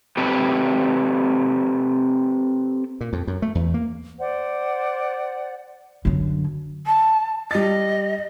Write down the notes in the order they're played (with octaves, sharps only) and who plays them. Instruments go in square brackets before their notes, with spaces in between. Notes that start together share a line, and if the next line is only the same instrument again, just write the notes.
[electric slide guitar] C4 G4 A4 B4
[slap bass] A#2
F2
F#2
A3
E2
A#3
[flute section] C5 D5 F#5
[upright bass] F#2 D3
[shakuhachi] A5
[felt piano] G3 A6 [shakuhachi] D#5